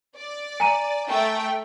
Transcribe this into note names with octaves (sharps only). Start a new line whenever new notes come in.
D5
G#5 A#5 D#7
A3 G5